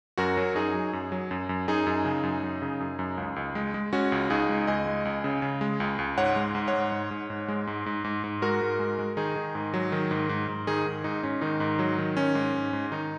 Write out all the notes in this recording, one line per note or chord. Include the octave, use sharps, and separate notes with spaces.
F#2 F#4 A#4
F#3
F#2 D#4 G#4
F#3
F#2
F#3
F#2
F#2
F#2 D#4 G#4
F#2
C#3
F#2
F#2
C#3
F#2
F#2
C#2
C#2
G#3
G#3
G#3 C#4 F#4
C#2
C#2 D#4 G#4
G#3
C#2 D#5 G#5
G#3
C#2
C#3
C#3
G#3
C#2
C#2
G#2 C#5 F#5
G#3
G#2
C#5 F#5
G#3
G#2
G#2
G#2
G#3
G#2
G#2
G#2
G#2
G#3 F#4 A#4
G#2
G#3
G#3
D#3 D#4 G#4
D#3
G#2
F#3
D#3
G#2
G#2
G#2
D#3 D#4 G#4
G#2
G#2 D#4
G#2 C#4
D#3 D#4
G#2
F#3
D#3
D#3 C#4
G#2
G#2
G#2
D#3 D#4